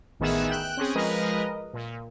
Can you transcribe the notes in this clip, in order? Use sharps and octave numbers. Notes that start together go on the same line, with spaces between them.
A1 D#3 B3 G#4 E5 E7
G5 F#6
C4 C#4 G#4
F3 G#3 A#4 B4 D#5
A#2